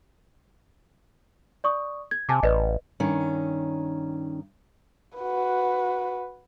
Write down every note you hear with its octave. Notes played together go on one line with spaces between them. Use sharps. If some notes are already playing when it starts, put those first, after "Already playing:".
D5 C#6 D#6
G#6
C3 G#5 A5 D6
A1 B4 D5 D#5
G2 D#3 C#4
F#4 B4